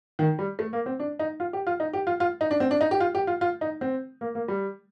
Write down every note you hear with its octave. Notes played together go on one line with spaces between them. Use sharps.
D#3
G3
A3
A#3
C4
D4
D#4
F4
G4
F4
D#4
G4
F4
F4
D#4
D4
C4
D4
D#4
G4
F4
G4
F4
F4
D#4
C4
A#3
A#3
G3